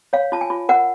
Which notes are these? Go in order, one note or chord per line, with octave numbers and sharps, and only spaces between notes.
C#5 F5
F4 A5
G#5
F4
A#4 F#5